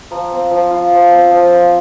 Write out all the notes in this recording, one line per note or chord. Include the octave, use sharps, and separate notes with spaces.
F3 A#5
C4
F3
F4
F3
C4
F3
F4